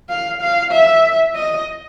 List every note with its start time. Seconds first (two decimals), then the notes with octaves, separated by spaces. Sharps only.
0.09 F5
0.41 F5
0.72 E5
1.36 D#5